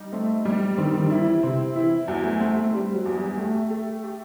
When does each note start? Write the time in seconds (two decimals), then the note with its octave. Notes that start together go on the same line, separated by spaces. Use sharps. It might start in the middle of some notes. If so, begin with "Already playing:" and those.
Already playing: G3 D#4
0.13 A3 C4
0.45 G3
0.77 D#3 C4
1.00 D#3
1.10 E4
1.21 E3
1.43 C3 C4
1.75 E3 E4
2.08 E2 F#3
2.24 A3
2.40 A3 C4
2.56 A3
2.73 G3 C4
2.94 F#3
3.05 E2
3.17 G3
3.38 A3 G4
3.70 A3
4.04 G4